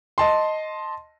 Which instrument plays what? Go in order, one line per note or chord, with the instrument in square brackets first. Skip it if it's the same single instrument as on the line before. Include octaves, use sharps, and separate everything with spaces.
[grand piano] D#5 A5 C6